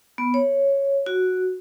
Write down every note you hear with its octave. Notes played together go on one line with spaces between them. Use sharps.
B3
C#5
F#4